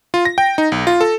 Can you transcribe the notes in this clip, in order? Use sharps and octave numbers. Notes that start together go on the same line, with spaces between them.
F4
A#6
G5
D#4
B1
F4
A4